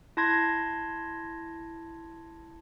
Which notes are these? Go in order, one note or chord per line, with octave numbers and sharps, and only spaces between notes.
E4 A5 C6 G#6 A#6